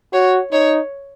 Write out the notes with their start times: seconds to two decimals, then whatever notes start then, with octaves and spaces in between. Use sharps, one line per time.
0.13 F#4 C#5
0.52 D#4 C#5